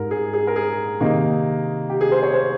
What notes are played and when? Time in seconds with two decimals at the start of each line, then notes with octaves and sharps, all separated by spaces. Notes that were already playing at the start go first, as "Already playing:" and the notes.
Already playing: G#2 G3 A#4
0.11 G#4
0.33 G#4
0.47 A#4
0.56 G#4
1.00 C3 D#3 A#3 D#4
1.89 G4
2.01 G#4
2.12 C5
2.23 C#5
2.34 C5